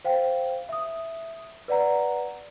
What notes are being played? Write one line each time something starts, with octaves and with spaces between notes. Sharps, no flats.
C5 F5 G5
E5 D#6
B4 D5 F#5 A#5